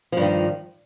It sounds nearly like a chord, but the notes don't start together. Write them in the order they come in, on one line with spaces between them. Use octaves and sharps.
F3 G2 D#3